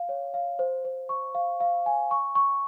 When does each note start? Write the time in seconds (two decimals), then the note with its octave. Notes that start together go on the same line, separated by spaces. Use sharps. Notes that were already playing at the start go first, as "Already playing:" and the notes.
Already playing: F5
0.09 C#5
0.34 F5
0.59 C5
0.85 C5
1.09 C#6
1.35 F5
1.60 F5
1.86 G#5
2.11 C#6
2.35 C#6